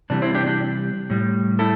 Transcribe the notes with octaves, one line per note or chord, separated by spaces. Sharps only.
C3 E3 G3 D4
C4 E4
D4 G4
D4 G4
A2 G3
E4 A4